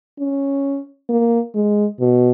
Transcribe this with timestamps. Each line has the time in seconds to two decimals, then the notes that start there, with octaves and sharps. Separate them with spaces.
0.19 C#4
1.09 A#3
1.55 G#3
2.00 B2